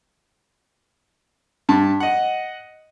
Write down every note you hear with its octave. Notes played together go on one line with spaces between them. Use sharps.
G2 A5
D#5 F#5